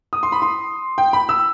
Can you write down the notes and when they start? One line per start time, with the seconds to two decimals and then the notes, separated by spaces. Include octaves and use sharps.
0.13 D#6
0.23 C6
0.32 B5
0.42 C6
0.98 G5
1.13 B5
1.29 E6